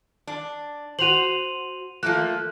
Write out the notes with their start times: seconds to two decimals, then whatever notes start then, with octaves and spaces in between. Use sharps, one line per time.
0.27 D4
0.99 F#4 C5 D#7 F7 F#7
2.03 F3 A3 A#3 F#6